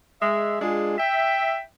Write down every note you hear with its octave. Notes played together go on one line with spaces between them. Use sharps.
G#3 E5
G#3 D4 F4 G#4
E5 G5